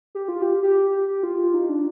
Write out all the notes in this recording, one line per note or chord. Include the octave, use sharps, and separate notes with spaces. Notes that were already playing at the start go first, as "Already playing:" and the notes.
G4
F4
G4
G4
F4
D#4
D4